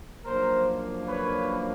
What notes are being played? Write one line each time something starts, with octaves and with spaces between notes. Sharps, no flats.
F#2 C#3 F3 A#3 D4 A#4 C5
B4 C#5